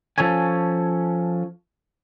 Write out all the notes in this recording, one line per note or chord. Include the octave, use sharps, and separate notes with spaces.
F3 C#4 A4 C#5 G#5